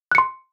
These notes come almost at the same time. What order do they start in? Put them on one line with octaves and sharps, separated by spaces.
F#6 C#7 C6